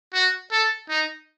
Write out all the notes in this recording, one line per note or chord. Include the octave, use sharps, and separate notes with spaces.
F#4
A4
D#4